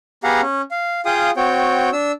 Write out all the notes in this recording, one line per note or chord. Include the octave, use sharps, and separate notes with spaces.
B3 G4 G#4 F5 F#5 A#5
C#4
F5
F4 G#4 F5 G5 D#6
C4 F#4 C#5 G5
D4 E6